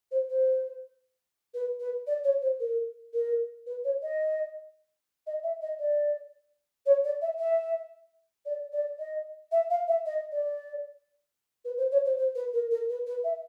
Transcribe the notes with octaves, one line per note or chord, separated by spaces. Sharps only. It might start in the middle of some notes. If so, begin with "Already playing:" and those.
C5
C5
B4
B4
D5
C#5
C5
A#4
A#4
B4
C#5
D#5
D#5
E5
D#5
D5
C#5
D5
E5
E5
D5
D5
D#5
E5
F5
E5
D#5
D5
B4
C5
C#5
C5
C5
B4
A#4
A#4
B4
B4
E5